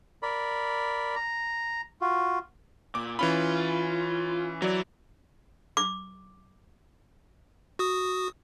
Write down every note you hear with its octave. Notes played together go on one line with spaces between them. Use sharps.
A#4 D5 B5
A#5
F4 F#4
A#2 D6
E3 C#4 F4 B5
E3 F#3 F#4 D5
D6
F#4 D#6